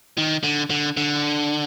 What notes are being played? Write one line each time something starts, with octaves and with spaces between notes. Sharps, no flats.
D#3
D3
D3
D3